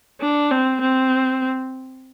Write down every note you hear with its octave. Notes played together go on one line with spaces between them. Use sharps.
D4
C4
C4